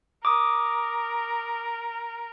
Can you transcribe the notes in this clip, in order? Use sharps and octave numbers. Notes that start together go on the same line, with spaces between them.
A#4 D6 D#6